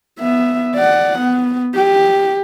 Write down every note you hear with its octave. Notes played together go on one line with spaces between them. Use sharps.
B3 E5
D5 F#5
B3
G4